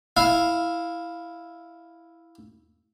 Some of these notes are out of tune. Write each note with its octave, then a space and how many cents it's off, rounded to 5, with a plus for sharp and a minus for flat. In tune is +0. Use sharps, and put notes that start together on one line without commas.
E4 +0 F5 +0